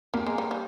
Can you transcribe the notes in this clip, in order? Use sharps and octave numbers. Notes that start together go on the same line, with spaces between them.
G3 A#3
G#3
G3
G3